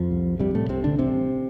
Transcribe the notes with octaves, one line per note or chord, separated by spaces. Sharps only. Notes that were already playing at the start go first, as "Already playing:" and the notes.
Already playing: F2 F3
C2
G2 C3 G3
A2 A3
C2 C3 C4
D3 D4
A1 C3 C4